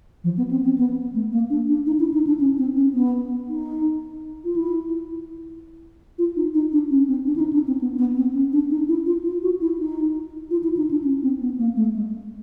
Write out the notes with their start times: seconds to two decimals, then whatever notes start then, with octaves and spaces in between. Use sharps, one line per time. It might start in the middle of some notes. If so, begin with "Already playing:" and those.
0.24 F3
0.37 B3
0.51 C4
0.65 C4
0.78 B3
1.14 A3
1.32 A#3
1.50 D4
1.68 D4
1.86 D#4
2.00 E4
2.14 D#4
2.27 D4
2.40 C#4
2.58 C4
2.76 C#4
2.94 B3
3.48 D#4
4.45 F4
4.56 E4
6.18 F4
6.36 D#4
6.54 D#4
6.72 D4
6.90 C#4
7.08 C4
7.26 D4
7.36 E4
7.40 D#4
7.53 D4
7.67 C4
7.81 B3
7.98 B3
8.16 C4
8.34 C#4
8.53 D4
8.71 D#4
8.88 E4
9.06 F4
9.25 F4
9.42 F#4
9.61 E4
9.78 D#4
10.51 F4
10.63 E4
10.77 D#4
10.91 D4
11.04 C#4
11.22 C4
11.41 B3
11.59 A#3
11.76 A3
11.95 G#3